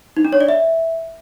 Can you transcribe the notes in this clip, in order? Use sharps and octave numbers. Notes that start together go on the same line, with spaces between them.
D#4
D4
C#5
D5
E5